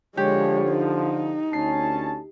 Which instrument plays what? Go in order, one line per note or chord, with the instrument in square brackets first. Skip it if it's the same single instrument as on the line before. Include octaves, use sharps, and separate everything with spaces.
[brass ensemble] D3 F3 [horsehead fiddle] G#3 C#5 [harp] G4
[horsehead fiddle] D#4
[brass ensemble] D2 C#4 A5 [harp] C7